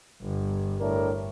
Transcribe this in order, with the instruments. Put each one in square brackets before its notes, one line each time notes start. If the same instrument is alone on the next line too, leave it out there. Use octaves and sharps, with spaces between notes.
[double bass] G1
[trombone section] A2 D4 A#4